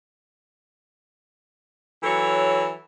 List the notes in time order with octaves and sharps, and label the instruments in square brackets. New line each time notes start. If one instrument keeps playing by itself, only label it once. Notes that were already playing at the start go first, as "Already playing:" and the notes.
[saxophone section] E3 F#3 A4 C#5